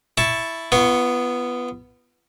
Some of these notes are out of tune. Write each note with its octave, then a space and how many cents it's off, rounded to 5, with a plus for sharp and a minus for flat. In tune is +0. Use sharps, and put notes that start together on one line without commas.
E4 +0 A5 +0 C#6 +0
B3 +0 F4 -40 C#6 +0